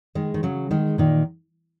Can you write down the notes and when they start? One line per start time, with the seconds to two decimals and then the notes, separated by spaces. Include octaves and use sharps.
0.15 D#3 G#3
0.34 D#3
0.43 C#3 F#3
0.71 D#3 G#3
0.98 A#2 D#3